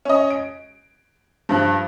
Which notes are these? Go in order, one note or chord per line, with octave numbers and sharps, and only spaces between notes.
C#4 D#5
D7
G2 F3 F#6